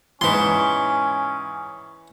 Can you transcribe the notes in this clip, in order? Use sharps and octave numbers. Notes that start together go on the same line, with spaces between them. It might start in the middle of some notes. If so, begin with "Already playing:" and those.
E2 G#2 E3 C#4 C6